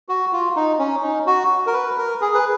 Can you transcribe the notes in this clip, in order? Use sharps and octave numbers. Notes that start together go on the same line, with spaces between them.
F#4
F4
D#4
C#4
D#4
F#4
A#4
B4
A#4
G#4
B4